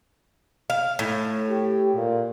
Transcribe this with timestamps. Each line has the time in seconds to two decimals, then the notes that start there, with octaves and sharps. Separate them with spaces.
0.70 F5
0.99 A2
1.50 G4
1.96 A#2